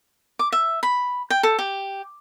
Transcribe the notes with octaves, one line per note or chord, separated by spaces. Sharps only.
D6
E5
B5
G5
A4
G4